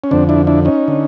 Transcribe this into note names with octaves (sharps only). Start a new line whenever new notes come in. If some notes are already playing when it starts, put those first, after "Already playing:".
C#4
F2 D3 C4 D4
D4 E4
D4 E4
C#4 D#4
D3